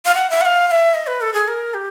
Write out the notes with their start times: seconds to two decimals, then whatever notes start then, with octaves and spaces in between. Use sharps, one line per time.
0.05 F5
0.15 F#5
0.30 E5
0.41 F#5
0.45 F5
0.67 F5
0.71 E5
0.94 D#5
1.07 B4
1.21 A4
1.34 G#4
1.48 A#4
1.74 G4